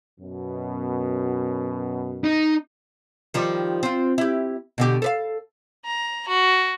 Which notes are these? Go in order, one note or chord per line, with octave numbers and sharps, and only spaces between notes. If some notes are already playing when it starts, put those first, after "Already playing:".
F#2 B2
D#4
D#3 F3 G3
C4 F4
E4 G4
B2 D3 G4
A4 B4 F5
A#5
F#4